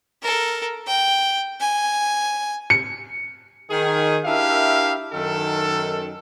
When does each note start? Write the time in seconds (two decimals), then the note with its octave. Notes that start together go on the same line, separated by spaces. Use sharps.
0.22 A4 A#4
0.87 G5
1.60 G#5
2.70 C#7
3.71 D#3 G#4
4.25 D4 E4 G4 A#4 E5 F5
5.13 F#2 D#3 A4